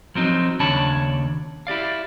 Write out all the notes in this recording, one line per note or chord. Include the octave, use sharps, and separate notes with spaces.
F3 F#3 C4 D#4
D#2 C#3 D4 C#5 A5 B5
E4 G4 D5 F5